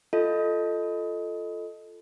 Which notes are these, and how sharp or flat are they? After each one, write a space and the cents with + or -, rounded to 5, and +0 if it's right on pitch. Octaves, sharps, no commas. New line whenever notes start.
F4 -5 A4 +0 D#5 +0